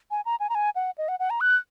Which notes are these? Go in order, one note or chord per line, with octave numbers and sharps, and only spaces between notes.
G#5
A#5
G#5
A#5
G#5
F#5
D#5
F#5
F#5
A#5
F#6